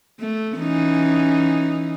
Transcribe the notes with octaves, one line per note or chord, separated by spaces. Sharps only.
A3
E3 C#4 D#4